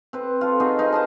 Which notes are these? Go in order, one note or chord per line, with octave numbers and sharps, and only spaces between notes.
C4 B4
F4 A4
C4 D#4 F#4 G#4
D#4 F4 B4
F4 D#5 A5